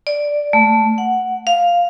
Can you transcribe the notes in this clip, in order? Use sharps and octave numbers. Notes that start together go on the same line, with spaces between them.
D5
A3
F#5
F5